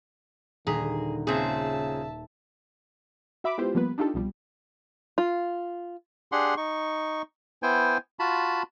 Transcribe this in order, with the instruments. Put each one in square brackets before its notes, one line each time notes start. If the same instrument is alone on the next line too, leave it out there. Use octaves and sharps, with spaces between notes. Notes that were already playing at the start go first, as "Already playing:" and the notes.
[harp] D#1 A#5 B6 [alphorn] D3 [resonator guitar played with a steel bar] G#4
[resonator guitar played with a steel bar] A#2 C4 G#4 [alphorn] C#3 [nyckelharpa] E5 A5
[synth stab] F#4 E5 B5 D6
G#3 B3 E4 F4 G4 C5
F3 G3 A#3 B3 B4
D4 D#4 F4 G4 A4
C2 B2 F3 G3
[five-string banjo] F4
[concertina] D4 G4 G#4 F#5 C6
D#4 C#6
B3 E4 C5 G5 G#5
F4 F#4 A5 B5